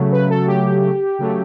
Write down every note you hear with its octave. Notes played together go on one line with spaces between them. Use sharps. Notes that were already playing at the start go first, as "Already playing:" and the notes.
Already playing: C#3 F#3 A3
B4
A4
G4
C#3 F#3 A3